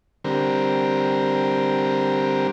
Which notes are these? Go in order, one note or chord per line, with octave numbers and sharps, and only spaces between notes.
D3 G3 C4 A#4